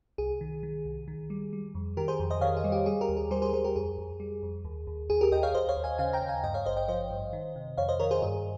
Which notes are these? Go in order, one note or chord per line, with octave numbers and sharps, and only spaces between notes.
C2 G#4
D#3
D#3
C2
D#3
G3
G3
F2
D#3 G4 A#4
G#4 C5
F2
C5 D#5
D#3 C#5 F5
G#4
G3
G4
G3 G#4
G4 A#4
D#2
G#4
G3 G#4 C5
G#4 C5
G3 G#4 C5
G4 A#4
F2 G#4
F2
G3
F2
D#2
D#2
D#2 G#4
G4 A#4
D#2 D#5 G5
C#5 F5
D#2 C5 D#5
C#5 F5
D#2
F5 G#5
C#3 F5 G#5
G5 A#5
D#2
F5 G#5
G2 D#5 G5
C#5 F5
G#1 C5 D#5
D#5 G5
F3 C5 D#5
G2
D#3
C3
F2 C#5 F5
C5 D#5
D#3 A#4 C#5
G#4 C5
G2 G#4